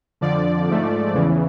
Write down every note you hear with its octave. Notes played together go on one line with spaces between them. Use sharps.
F2 D3 F3 D5
G#2 F3 A3
E2 C#3 E3